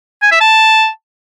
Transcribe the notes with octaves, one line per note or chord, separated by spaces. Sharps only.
G#5
E5
A5